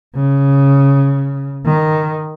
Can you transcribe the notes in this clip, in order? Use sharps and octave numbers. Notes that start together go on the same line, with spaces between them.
C#3
D#3